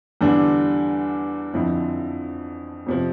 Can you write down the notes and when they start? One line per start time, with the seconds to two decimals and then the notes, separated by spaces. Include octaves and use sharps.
0.21 E2 D3 G3 D4 A4
1.54 F2 D3 F3 C4 E4
2.86 F2 C3 F3